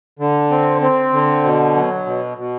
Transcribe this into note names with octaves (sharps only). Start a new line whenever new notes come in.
D3
C4
C4
D3
B2
F#3
B2
B2